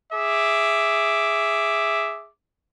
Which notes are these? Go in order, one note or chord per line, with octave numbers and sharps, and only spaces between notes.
G#4 E5 D6